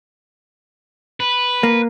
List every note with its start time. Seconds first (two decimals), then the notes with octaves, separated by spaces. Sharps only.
1.20 B4
1.63 A#3